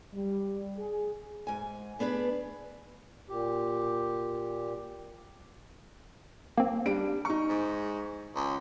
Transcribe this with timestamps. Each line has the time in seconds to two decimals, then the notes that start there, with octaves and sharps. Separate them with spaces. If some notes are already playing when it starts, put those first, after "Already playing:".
0.14 G3
0.78 G#4
1.47 G#2 G#5
1.99 A2 B3 D4 G#4 B4
3.30 A#2 G4
6.58 A#3 C4
6.86 G3 D4 D7
7.25 D#4 C#6
7.49 G#2
8.36 C#2